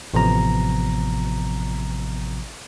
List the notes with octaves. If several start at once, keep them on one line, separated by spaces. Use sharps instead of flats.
A1 C3 F3 B3 A#5